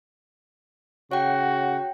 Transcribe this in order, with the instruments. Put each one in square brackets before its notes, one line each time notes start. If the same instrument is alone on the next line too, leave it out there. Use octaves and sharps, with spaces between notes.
[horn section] C#3 F#4 [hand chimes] C#5 F#5 G5